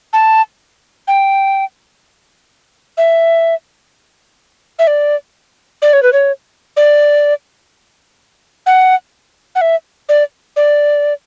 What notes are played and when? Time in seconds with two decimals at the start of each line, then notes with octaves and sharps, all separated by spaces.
0.13 A5
1.08 G5
2.97 E5
4.79 E5
4.87 D5
5.82 D5
5.93 C#5
6.03 B4
6.13 C#5
6.77 D5
8.66 F#5
9.55 F#5
9.61 E5
10.09 D5
10.56 D5